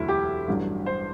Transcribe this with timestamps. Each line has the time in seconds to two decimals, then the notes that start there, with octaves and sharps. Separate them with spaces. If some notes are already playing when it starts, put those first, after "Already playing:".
Already playing: E1 D2 D3 F#3 E4
0.08 G4
0.48 A1 G2 F#3
0.86 C5